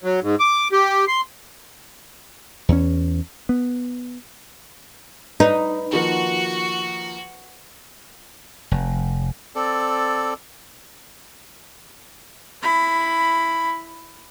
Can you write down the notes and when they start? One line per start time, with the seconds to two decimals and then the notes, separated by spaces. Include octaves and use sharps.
0.04 F#3
0.22 G#2
0.40 D6
0.72 G4
1.08 C6
2.69 E2 C#4
3.49 B3
5.40 D#4 B4
5.93 D#3 F3 A#3 F#4
8.71 F1
9.55 C4 A4 D5
12.62 E4 B5